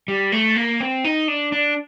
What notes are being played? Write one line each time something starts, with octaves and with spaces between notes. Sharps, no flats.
G3
A3
A#3
C4
D#4
D4
D4